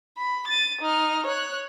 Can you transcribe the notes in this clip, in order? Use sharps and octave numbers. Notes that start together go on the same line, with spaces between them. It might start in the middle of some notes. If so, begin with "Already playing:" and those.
B5
A6 D#7
D#4 F6
C#5 F#6